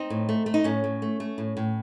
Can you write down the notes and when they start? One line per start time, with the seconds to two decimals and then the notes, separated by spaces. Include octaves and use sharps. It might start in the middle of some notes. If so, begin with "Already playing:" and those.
Already playing: C4 D#4
0.10 A2
0.29 A3
0.46 A3
0.54 D#4
0.64 A2 C#4
0.84 A2
1.02 A3
1.20 A3
1.38 A2
1.57 A2